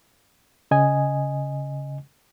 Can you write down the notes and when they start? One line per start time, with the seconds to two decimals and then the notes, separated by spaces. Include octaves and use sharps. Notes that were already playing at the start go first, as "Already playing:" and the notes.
0.71 C#3 D#5 G#5